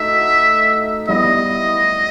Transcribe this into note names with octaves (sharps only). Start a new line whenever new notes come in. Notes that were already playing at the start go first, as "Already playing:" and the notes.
Already playing: A3 D#4 F#4 E5
G3 B3 E4 D#5